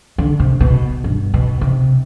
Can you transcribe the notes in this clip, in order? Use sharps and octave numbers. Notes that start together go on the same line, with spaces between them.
D3
C3
B2
G2
B2
C3